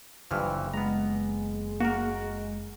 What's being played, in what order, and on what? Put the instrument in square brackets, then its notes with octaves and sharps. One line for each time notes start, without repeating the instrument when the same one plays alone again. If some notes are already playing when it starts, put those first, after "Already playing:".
[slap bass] F#1 [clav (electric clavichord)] G2 E3 F3 [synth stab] F6
[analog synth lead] G#3 [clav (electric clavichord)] B3 A#5
[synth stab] A#3 [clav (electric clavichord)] F#4 A#4